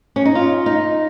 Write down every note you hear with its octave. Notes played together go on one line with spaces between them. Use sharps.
C#4
D#4
F4
D#4